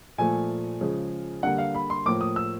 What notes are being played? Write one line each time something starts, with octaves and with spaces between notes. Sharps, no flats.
A#2 F3 A3 G#5
C#3 F3 G#3
D3 G3 A#3 F#5
F5
B5
C6
A2 F3 A#3 D6
D#6
E6